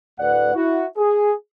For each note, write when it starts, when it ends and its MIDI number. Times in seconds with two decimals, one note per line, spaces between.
0.20 0.54 38
0.20 0.54 45
0.20 0.54 71
0.20 0.54 74
0.20 0.54 78
0.55 0.86 64
0.55 0.86 66
0.97 1.33 68